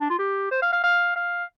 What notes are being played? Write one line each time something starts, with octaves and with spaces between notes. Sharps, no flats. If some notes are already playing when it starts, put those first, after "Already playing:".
D4
F4
G4
C5
F5
F5
F5
F5